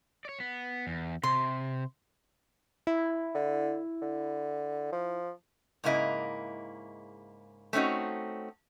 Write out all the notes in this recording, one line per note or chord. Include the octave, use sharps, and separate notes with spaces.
C#5 D5
B3
E2
C3 C6
E4
D3
D3
F3
G#2 C#3 A#3 E4 D#5
A3 C4 C#4 D#4 F#4